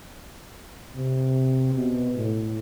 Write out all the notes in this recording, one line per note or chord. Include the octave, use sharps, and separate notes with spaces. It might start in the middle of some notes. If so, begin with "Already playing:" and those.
C3
B2
A2